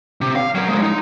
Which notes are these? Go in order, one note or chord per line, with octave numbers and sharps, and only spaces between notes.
C3
F5
F#3 A#4
F3 G#3
D#4